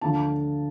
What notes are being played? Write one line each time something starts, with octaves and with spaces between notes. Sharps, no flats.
D2 D3 F3 A5